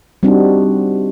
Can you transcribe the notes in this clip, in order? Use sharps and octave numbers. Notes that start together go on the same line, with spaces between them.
G3 C4 D4 D#4 F#4